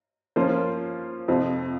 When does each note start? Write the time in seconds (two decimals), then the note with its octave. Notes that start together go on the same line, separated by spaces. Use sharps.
0.36 F3 A#3 C#4 F4 C5
1.28 F2 C3 F3 C4